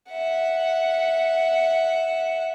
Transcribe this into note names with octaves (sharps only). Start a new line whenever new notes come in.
E5 F#5